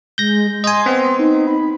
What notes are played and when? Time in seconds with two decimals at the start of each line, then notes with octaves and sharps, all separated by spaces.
0.18 G#3 G6 A#6
0.64 D#5 G#5 C6
0.86 B3 C4
1.19 D#4
1.47 B5